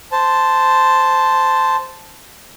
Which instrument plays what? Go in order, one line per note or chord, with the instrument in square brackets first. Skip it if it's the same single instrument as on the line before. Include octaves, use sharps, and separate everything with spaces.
[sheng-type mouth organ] C5 A5